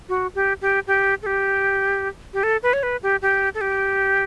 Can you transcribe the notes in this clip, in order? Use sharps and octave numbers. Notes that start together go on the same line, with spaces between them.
F#4
G4
G4
G4
A4
G4
G4
A4
B4
C#5
B4
G4
G4
A4
G4